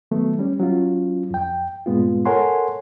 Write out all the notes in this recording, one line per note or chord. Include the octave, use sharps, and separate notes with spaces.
D#3 F#3 A3 B3
G3 C#4
F#3 C#4 F4
F2 G5
G2 A#2 G#3 B3 F4
A4 A#4 C#5 F#5 G#5 C6